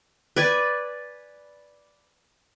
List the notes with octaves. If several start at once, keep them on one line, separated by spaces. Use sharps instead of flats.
B4 D5 G#5